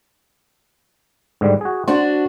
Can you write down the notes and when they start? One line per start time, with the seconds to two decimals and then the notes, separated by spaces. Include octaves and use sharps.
1.41 G#2 D3 G3
1.61 F#4 G#4
1.88 D4 F#4 C5